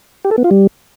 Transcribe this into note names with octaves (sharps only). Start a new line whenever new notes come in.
G4
A4
B3
F4
G3